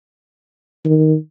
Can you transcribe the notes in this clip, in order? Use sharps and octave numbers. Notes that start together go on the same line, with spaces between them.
D#3